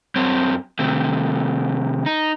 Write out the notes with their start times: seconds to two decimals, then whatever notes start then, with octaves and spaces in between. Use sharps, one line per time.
0.16 F#2 C4 C#5
0.79 C3 D#3 A3
2.06 D#4